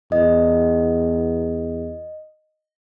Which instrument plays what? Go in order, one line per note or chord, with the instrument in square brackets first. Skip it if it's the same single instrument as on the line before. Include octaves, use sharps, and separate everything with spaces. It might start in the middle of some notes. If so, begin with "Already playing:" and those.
[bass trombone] E2 [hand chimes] D#5